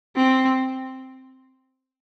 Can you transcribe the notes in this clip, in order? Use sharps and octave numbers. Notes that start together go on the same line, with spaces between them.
C4